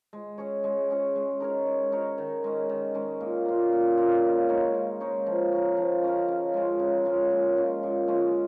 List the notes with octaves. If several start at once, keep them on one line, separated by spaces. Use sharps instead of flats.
G#3
C#4 G#4 C#5
G#3
C#4 G#4 C#5
G#3
D#4 A#4 C#5
G#3
D#4 A#4 C#5
D#3
G#3 C#4
D#3
G#3 C#4
A#2
A#3 F4
A#2
A#3 F4
C#3
G#3 D#4 C#5
C#3
G#3 D#4 C#5
F3
C#4 A#4
F3
C#4 A#4
C#3
G#3 C#4 F4
C#3
G#3 C#4 F4
A#2
G#3 C#4 F4
A#2
G#3 C#4 F4